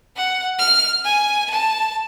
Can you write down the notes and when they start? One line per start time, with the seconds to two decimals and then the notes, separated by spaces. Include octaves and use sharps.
0.16 F#5
0.59 F6
1.05 G#5
1.51 A5